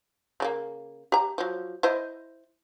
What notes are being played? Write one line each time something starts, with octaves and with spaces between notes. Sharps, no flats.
C#3 G3 A#3
G4 A#5
F3 F#3
E4 C5 D#5